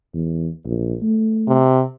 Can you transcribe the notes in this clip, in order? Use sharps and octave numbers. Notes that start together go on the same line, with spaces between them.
E2
A#1
A3
C3